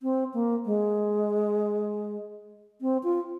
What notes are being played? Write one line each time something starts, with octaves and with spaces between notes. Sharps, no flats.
C4
A#3
G#3
C4
F4